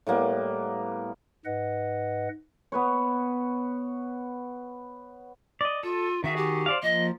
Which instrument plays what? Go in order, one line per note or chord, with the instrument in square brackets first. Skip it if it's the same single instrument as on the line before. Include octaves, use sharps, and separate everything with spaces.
[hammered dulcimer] A2 G3 A#3 B3
[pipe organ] G#2 B4 D#5 F#5
[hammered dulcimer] B3 B4 C#5
[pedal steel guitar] D5 D#5
[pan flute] F4 [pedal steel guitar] A4
[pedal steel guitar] D#3 F#4 G#4 [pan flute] E5
[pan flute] G4
[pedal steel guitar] C5 D5 F5
[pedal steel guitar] F3 A#3 [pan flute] D#5